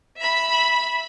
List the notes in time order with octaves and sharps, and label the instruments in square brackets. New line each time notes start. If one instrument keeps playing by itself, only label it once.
[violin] E5 B5